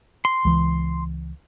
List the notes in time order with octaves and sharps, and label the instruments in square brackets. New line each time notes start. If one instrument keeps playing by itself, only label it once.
[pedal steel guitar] C6
[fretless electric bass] C#2 E3